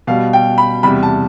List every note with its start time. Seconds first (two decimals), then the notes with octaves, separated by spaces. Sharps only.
0.07 B2 G3 F5
0.33 G5
0.58 B5
0.83 E2 C3 G3 B5
1.03 A5